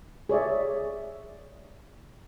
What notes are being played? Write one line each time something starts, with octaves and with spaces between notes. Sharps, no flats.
G#4 C#5 D5 E5